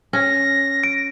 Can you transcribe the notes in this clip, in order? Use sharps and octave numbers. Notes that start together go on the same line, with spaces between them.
C#4 A#6
D7